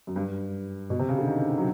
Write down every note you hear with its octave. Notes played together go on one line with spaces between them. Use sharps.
F#2
G2
B2
C3
C#3
D3
D#3
F#3